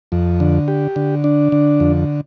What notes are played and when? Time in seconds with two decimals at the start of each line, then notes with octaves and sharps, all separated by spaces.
0.12 F2
0.40 D3
0.68 G4
0.96 D3
1.24 D4
1.52 D3
1.80 F2